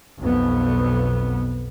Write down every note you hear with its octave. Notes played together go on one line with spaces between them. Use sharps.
B1 F2 B3